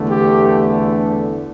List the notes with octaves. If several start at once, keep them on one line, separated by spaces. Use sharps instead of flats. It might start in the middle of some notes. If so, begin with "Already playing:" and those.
Already playing: E2 D3 A3
G4